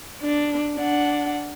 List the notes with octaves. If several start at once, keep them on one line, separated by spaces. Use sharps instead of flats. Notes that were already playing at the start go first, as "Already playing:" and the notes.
D4
D4 F#5